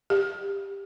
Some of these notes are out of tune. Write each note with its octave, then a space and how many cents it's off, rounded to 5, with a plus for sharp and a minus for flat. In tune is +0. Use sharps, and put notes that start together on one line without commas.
G4 +15